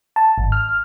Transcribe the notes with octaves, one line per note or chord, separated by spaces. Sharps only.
A5
G#1
F6